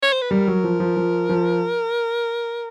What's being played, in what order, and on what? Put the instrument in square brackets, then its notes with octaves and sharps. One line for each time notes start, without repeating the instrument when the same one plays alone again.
[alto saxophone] C#5
C5
B4
[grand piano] G3 [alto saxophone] A#4
[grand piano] F#3
F3
F3
F3
F3